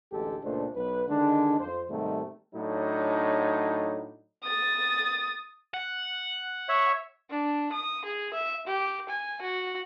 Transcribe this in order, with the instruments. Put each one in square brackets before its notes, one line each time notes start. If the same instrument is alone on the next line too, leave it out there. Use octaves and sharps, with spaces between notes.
[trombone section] A1 D2 G#3 G4 A4
C#2 A#2 A3 D4 C5
B1 B4
D3 D#3 G#3 D4
F2 C5
G#2 C3 D#3 G3 A3
A2 F#3 D4 D#4
[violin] D#6 A6
[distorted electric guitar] F#5
[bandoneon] C#5 E5
[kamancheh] D4
D#6
G#4
E5
G4
G#5
F#4